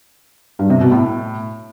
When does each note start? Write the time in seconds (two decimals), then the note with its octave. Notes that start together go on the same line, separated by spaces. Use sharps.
0.59 G2
0.70 C3
0.81 B2
0.92 A2